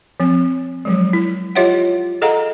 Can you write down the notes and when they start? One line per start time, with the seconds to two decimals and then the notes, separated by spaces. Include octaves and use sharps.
0.20 F3 C4
0.85 F3 F#3 G#3
1.13 E4
1.55 F4 G4 C#5 D#5 E5 F#5
2.22 G#4 A4 D#5 F5 F#5 A#5